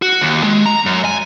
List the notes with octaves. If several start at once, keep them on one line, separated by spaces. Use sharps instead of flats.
F#4
D#2
G#3
A#5
F#2
G#5